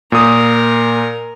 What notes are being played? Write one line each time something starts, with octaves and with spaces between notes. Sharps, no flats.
A#2 A#4 D#6